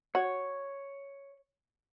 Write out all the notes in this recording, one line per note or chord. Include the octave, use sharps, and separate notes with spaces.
F#4 C#5